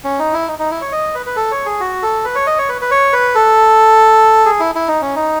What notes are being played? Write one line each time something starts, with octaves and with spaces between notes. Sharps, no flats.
C#4
D#4
E4
D#4
D#4
E4
C#5
D#5
B4
B4
A4
C#5
G#4
F#4
A4
B4
C#5
D#5
C#5
B4
B4
C#5
B4
A4
G#4
E4
E4
D#4
C#4
D#4